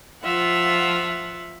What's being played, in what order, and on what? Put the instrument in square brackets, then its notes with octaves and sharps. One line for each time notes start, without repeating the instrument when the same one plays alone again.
[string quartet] F3 F4 E5 F#5